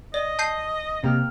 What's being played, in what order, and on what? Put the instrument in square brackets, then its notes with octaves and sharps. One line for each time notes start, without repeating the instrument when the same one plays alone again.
[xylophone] D5 [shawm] D#5
[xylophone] A5 G6 C7
[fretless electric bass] C3 [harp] A#3 G4 F6